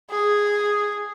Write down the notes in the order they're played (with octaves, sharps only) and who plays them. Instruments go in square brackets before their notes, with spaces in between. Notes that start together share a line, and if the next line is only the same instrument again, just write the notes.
[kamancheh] G#4